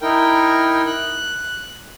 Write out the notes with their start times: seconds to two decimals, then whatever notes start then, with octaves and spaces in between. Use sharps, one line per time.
0.01 D#4 E4 A#4 G5
0.87 F#6